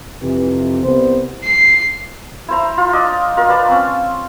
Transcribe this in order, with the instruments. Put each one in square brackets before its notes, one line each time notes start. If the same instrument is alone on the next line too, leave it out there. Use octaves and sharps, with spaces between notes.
[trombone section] F2 C3 E3
C2 B3 C5
[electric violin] C7
[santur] E4 C5 A#5
F4
D4 D#5 D6
F4 A#4
B4 D5 A5
C4 C#4